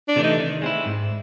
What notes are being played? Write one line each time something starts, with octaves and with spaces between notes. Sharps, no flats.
D4
C3 E3 A3
D#4
D#3
G#3 C4 E4
G#2